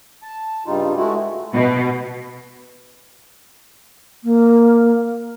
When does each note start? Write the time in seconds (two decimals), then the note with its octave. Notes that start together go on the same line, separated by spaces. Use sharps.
0.23 A5
0.66 G2 C#3 G3 D#4 F4
0.97 G#3 A3 E4 F#4
1.53 B2
4.24 A#3